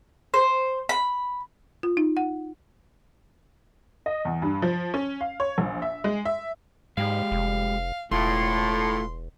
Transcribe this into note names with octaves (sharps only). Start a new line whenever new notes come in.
C5
B5
F4
D#4
F#5
D#5
E2
G2
F3
C#4
F5
C#5
A#1
E5
G#3
E5
G#2 G#3 G4 F5
F1
E1 A2 A3 F4 C6